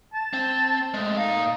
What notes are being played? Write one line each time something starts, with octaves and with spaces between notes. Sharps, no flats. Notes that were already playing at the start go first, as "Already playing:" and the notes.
A5
C4
G#3 A3
A#2 D#4 F5